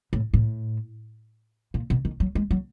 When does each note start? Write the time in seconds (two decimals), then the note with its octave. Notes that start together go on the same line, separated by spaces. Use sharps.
0.13 A2
0.34 A2
1.74 A#2
1.90 B2
2.05 D#3
2.20 F#3
2.35 G#3
2.51 F#3